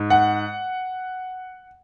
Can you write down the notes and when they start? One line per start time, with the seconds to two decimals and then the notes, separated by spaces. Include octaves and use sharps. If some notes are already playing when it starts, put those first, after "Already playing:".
Already playing: G#2
0.10 F#5